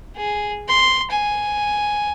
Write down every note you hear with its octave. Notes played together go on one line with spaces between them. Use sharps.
G#4
C6
G#5